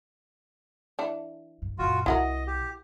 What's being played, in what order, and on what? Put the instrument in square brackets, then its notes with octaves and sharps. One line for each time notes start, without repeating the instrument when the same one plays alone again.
[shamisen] E3 D4
[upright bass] G2
[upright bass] F#2 A#2 [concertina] F4 F#4
[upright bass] C2 C3 [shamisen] E4 F#4 A#4 [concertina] D#5
[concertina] G4